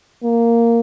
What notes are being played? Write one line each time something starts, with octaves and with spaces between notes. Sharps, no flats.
A#3